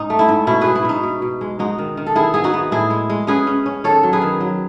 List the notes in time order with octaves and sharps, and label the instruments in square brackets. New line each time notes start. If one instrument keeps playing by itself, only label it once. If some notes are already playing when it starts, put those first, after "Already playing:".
Already playing: [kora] G#2 D#4
A3
E4
G#2
B2 E4
B2 G#4 B4
E4
B2 D#4
B2
B2
G#3
G#3 D#4 F#4
D#3
D#3
A4
D#3 E4 G#4
B3 G#4
D#4 F#4
B3
A2 E4 G#4
G#3
G#3
C#4 G#4 B4
C#4
C#4
D#3 A4 C#5
F#3
G#4 B4
D#3
F#3